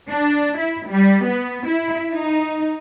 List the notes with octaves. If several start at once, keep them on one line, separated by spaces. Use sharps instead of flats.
D4
E4
G3
B3
E4
D#4